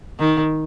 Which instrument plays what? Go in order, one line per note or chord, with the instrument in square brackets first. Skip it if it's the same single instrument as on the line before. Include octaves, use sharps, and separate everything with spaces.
[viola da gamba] D#3